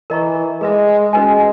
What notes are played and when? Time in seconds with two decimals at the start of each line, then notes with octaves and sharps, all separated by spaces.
0.10 E3 A#4 D#5 A#5 C#6
0.61 G#3 G#4 B4 E5
1.13 G#3 C#4 F#4 B4 D#5 G#5